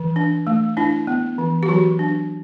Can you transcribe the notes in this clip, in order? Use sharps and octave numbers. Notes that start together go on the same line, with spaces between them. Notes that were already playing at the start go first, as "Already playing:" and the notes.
Already playing: E3
D4
A3
D4 E4
B3
E3
G4
E3 F#3 F#4
D4